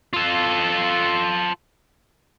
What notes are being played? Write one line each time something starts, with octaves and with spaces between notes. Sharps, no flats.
F4 A4